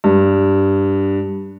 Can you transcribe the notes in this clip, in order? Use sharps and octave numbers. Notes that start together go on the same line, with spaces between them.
G2